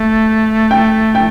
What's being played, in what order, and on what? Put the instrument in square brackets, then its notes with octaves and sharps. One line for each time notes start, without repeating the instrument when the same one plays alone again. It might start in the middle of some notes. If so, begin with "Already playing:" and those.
Already playing: [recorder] A3
[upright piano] G5
G5